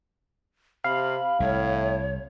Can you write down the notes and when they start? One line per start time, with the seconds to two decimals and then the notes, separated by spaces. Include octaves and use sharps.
0.84 C3 F5 B5
1.40 C2 A2 C#5